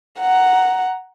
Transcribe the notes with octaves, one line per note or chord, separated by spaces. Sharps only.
F#5 A#5